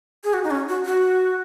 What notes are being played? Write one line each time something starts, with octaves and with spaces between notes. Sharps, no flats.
G#4
F#4
D#4
C#4
F#4
F#4